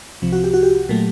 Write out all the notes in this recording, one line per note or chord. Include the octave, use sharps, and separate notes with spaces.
C2 C3 F3
F#4
G4
F#4
G4
A#2 F#3 A3